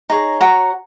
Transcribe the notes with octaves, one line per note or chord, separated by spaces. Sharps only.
D#4 G#4 C#5 A#5
F#4 C#5 A#5